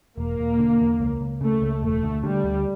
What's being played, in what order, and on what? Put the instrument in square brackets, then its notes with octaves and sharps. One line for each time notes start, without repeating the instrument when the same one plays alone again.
[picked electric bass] E1 [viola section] A#3
[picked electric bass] E1
D3
E2
C#2
C#2
[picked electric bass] C#3 [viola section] A3
[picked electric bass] C#2
[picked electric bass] E1 [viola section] A3
[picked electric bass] D2
[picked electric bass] D3 [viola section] G3
[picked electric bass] D2